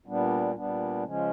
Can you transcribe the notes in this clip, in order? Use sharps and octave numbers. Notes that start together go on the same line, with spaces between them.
A#2 G3 B3 D4
A#2 G3 B3 D4
C#3 F3 G#3 C#4